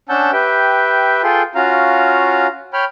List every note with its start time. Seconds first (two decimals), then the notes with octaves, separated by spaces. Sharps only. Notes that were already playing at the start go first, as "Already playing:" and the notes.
0.09 C#4 D4 F#5 A5 E6 G6
0.33 G4 B4 E5 G5
1.24 F4 G#4 A4 G5 C6
1.55 C#4 F4 F#4 F5 A#5
2.73 C#5 G5 B5 F6